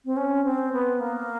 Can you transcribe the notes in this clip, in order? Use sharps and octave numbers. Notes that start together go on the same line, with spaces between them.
C4
C#4
C4
B3
A#3